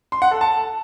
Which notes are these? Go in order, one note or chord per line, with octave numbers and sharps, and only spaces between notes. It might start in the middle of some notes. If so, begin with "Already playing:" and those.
C6
F#5
A4
A5